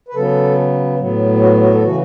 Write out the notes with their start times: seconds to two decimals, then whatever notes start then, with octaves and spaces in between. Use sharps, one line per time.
0.08 B4
0.14 C#3 F#3 B3 A4
0.99 A2 F#3 B3
1.42 F#4
1.62 F#4
1.73 A4
1.83 C#3 E3 F#4